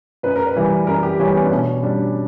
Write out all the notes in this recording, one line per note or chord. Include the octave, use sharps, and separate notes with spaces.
F#2 B4
A#4
B4
E3 G3
F#2 A#4
G4
E3 G3 C#4
B3
D4
B2 C#4
G3 D4